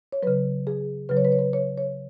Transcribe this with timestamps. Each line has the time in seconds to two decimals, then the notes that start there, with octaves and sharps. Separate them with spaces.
0.12 C#5
0.23 C#3 F#3 B4
0.67 G#4
1.09 C#3 F#3 B4
1.17 C#5
1.25 B4
1.32 C#5
1.39 B4
1.53 C#5
1.78 C#5